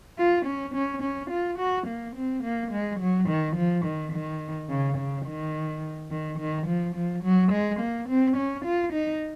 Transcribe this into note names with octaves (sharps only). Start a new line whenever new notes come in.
F4
C#4
C#4
C#4
F4
F#4
A#3
C4
A#3
G#3
F#3
D#3
F3
D#3
D#3
C#3
C#3
D#3
D#3
D#3
F3
F3
F#3
G#3
A#3
C4
C#4
F4
D#4